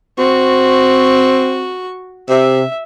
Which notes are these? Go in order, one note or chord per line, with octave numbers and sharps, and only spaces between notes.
C4 F#4 C#6
C3 E5